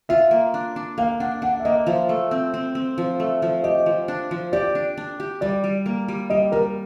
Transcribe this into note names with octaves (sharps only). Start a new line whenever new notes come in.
F4 E5
A#3
D4
D4
A#3 F5
D4 F#5
D4 F#5
E5
A#3 D#5
F3 E5
A3
C4
C4
C4
F3
A3
F3
G4 D#5
F3
D4
F3
G4 D5
D4
D4
G4
G3 D5
G3
A#3
G3
G3 D#5
G3 A#4